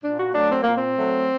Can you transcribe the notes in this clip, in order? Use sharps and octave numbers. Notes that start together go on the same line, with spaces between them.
A#2 D4
F#4
F#3 A3 D4
C4
A#2 A#3
C4
F#3 A3